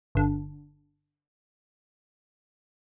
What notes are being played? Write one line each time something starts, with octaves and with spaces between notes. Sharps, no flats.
G1 D3